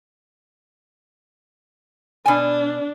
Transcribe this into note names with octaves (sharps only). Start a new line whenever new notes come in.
B2 D4 G#5